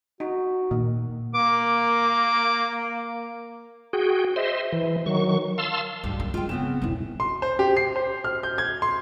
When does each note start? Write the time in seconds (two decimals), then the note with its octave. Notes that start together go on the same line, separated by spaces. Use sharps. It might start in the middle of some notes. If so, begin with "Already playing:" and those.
0.20 D#4 F#4
0.71 A#2 D#3
1.35 A#3 D6
3.93 F#4 G#4 G5
4.36 C5 D#5 E5 C6
4.72 E3
5.06 D#3 F#3 C#6
5.58 F5 A5 C6 E6
6.04 D2 G#2 G3 D4
6.20 D#2
6.34 D3 G#3 F4 G5
6.49 C#3 B3 C4 E7
6.82 E1 C2 A2 D#4
7.20 C6
7.42 C5
7.59 G4
7.77 C7
7.96 C5
8.24 F6
8.43 G6
8.58 G#6
8.82 C6